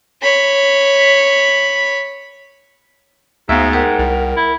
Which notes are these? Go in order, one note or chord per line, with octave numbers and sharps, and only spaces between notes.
C#5 B5
D2 G#2 B3 E5 F5
G4 A#4 F#5
C2
E4